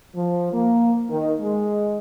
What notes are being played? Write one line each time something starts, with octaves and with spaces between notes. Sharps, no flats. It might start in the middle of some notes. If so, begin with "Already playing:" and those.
F3
A#3
D#3
G#3